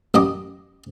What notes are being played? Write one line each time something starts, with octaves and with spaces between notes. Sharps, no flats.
A1 F#2 D#5 D6